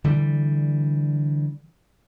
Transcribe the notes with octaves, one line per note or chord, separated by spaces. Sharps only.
D3 E3 G3